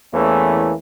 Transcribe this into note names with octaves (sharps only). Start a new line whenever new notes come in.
E2 E3 A3 A#3 C#4